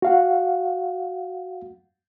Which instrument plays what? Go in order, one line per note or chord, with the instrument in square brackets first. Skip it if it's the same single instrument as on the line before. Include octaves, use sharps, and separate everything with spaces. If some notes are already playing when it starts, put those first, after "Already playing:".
[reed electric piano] F#4 F5 F#5